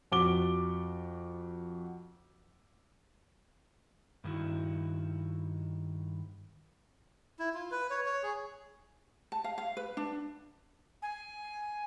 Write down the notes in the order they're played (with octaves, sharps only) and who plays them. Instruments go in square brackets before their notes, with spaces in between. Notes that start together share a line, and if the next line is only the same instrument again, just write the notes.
[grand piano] F2 F#4 D6 G7
[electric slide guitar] G2 D#3 B3 E4 F#4
[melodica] E4
F4
B4
C#5
C#5
G#4
[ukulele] A5
F5
F5
B4
D4
[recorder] G#5